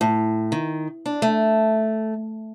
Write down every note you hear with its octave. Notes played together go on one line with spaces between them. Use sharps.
A2
D#3
D4
A3